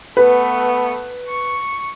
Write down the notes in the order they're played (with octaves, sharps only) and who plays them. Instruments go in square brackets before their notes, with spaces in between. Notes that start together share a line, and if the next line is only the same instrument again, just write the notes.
[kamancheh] A3 B3 [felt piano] B4
[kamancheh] C#6